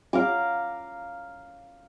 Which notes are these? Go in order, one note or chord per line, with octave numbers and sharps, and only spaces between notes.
F5 A#5 D6